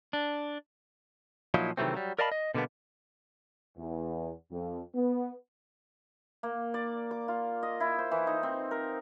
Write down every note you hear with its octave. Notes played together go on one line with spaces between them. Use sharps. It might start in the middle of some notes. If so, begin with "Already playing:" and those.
D4
A#2 F3 F#3 A#3 D#4 E4
C3 D#3 E3 F#3 A3 C4
F#3 G3
A#4 D5 D#5 F5 A5 B5
D#5
B2 D3 G3 A#3 B3
E2
F2
B3
A#3
D5
D6
F4
D#5
E4
C5
E3
D#4
C4
A#4